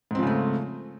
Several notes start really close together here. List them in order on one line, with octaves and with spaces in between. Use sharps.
G#2 C4 F3 C#3 A3